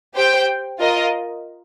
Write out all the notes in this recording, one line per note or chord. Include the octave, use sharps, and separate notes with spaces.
G4 C5 G5
F4 A#4 D#5